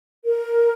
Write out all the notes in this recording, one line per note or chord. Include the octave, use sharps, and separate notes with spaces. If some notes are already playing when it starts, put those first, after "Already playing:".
A#4